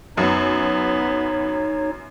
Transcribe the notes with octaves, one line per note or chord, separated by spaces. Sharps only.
F#2 B3 D#4 C#5